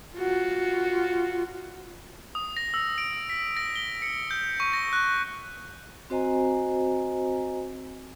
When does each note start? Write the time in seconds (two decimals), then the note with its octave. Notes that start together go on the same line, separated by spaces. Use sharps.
0.16 F4 F#4
2.35 D#6
2.57 A#6
2.74 E6
2.98 D7
3.29 B6
3.57 A#6
3.76 G7
4.02 C#7
4.31 G6
4.60 C#6
4.73 A#6
4.93 F#6
6.10 C4 F#4 C5 D#5 G#5 A#5